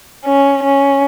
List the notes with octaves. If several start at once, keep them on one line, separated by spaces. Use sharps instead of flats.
C#4
C#4